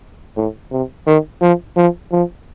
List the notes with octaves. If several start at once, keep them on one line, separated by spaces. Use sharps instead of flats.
A2
C3
D#3
F3
F3
F3